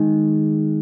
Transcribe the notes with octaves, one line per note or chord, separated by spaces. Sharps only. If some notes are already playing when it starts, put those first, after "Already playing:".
Already playing: D#3 G#3